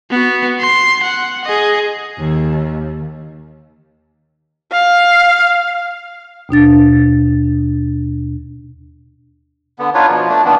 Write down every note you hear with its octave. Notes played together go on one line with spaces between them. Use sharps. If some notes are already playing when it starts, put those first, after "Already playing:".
B3 F#4
C6
F#5
G#4 D#5
D#2
F5
D#2 B2 D4 A6
D3 B3
D4 D#4 F4 B4 C#5
B2 F3
A3 D4
A#2 D#3 E3 B3 D4